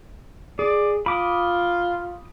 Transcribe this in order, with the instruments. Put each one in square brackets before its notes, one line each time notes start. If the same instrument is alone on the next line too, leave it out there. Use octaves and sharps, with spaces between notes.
[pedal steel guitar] G#4 [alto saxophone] D5
[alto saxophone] F4 [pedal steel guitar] B5 D6 D#6